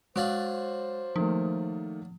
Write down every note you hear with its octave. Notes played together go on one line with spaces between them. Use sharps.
F#3 G#3 D4 C5 C#5 F5 A6
D#3 F3 A3 A#3